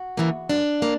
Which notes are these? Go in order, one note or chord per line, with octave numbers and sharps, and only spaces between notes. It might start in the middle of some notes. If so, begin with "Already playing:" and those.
Already playing: F#4
C#3 E3 A#3
F#2 D4
A#3